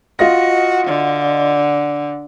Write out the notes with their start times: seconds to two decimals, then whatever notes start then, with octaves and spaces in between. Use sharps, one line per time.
0.19 F4 F#4 D#5 A#6
0.88 D3